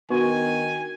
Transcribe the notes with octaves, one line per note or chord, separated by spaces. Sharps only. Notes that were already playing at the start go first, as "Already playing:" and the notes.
D#3 B3 D4 F#4 G#5 C#6